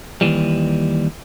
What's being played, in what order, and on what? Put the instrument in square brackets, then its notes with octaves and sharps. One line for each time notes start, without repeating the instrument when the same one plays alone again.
[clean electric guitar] D#2 G#2 E3 G3